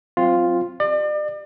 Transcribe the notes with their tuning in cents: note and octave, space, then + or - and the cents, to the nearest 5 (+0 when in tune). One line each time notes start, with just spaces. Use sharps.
F#3 +0 C4 +0 F4 +0
G4 +0 D5 +40